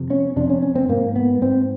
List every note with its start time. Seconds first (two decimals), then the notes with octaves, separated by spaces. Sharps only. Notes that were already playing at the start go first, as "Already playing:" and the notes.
Already playing: F2 C3
0.10 C#4
0.36 F2 C3 D4
0.49 C#4
0.62 C#4
0.75 C4
0.89 G#2 A#3
1.16 B3
1.42 G#2 C4